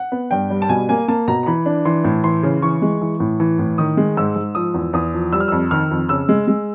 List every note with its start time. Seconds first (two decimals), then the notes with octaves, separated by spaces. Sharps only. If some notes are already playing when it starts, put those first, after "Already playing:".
Already playing: F#5
0.12 B3
0.31 G2 G5
0.50 G3
0.62 A5
0.69 B2 G#5
0.89 A#3 G#5
1.08 A#3 A5
1.28 B2 A#5
1.43 A#5
1.46 E3 B5
1.66 D4
1.85 E3 C6
2.04 A2
2.24 E3 C6
2.43 C#3
2.62 E3 C#6
2.82 G#3
3.01 E3
3.20 A2
3.40 E3
3.59 A2
3.78 D#3 D#6
3.97 G#3
4.17 G#2 E6
4.36 G#2
4.55 F3 D#6
4.74 E2
4.93 E2 D#6
5.14 F3
5.33 G3 E6
5.40 F6
5.48 F2 E6
5.71 D#3 F6
5.91 F2
6.09 C#3 E6
6.29 G#3
6.48 G#3